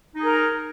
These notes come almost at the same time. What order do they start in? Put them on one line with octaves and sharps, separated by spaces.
D#4 G#4 A#4